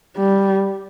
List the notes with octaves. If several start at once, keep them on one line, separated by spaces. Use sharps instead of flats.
G3